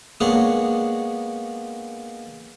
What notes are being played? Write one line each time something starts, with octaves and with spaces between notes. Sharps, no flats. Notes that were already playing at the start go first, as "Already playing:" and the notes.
G#3 A#3 B3 D4 C#5